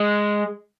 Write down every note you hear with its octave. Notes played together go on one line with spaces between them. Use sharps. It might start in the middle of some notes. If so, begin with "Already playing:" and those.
Already playing: G#3